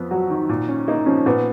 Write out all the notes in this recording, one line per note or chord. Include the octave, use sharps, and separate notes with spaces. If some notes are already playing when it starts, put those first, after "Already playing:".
Already playing: F2 F3 B3
F#3 F#4
D#3
A#2
C#4
A#3 D#4
F3 C#4
A#2 B3